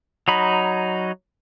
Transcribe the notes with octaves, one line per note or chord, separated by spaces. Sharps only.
F#3 D#4 B5